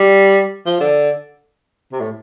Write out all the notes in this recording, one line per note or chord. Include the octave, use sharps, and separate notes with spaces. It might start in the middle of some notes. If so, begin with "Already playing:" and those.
Already playing: G3
F3
D3
C3
A2